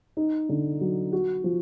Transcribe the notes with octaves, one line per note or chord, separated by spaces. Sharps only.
D#4
D3
F#3
F#4
F3